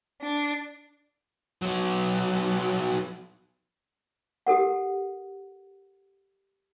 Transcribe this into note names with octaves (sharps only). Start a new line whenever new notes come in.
D4
F#3 B3
G4 A4 A#4 F#5